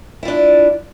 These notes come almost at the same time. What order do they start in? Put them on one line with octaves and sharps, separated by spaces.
E4 F4 D4